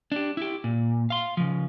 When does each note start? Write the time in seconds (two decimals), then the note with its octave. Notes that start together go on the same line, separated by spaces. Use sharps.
0.12 D4 G4
0.37 E4 G4
0.64 A#2
1.10 F5 C6
1.37 C#3 F3